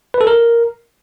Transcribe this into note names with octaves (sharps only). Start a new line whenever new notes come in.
B4
A4
A#4